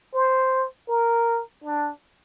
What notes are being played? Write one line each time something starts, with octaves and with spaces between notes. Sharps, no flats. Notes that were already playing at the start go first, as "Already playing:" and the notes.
C5
A#4
D4